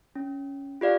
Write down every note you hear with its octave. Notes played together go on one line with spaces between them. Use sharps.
C#4
F4 G4 D5 F5